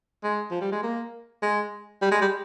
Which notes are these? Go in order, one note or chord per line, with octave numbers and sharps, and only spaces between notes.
G#3
F3
G3
G#3
A#3
G#3
G3
G#3
G3